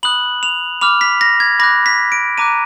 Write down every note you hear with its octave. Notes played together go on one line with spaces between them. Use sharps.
B5 D#6 F#6 F#7
F7
B5 D6 F6 F7
B6
A#6
G#6
B5 D6 F#6 A#6
B6
D7
A#5 D6 F#6 D#7